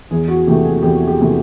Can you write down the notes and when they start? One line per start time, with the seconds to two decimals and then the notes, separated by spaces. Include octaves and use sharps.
0.11 E2 G#4
0.28 F#4
0.47 C3 E3 A3 G4
0.65 G#4
0.83 E2 G4
1.07 G4
1.20 C3 E3 A3